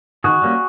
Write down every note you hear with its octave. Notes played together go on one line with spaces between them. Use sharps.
D#3 F#4 G#4
G3 A#3 C#4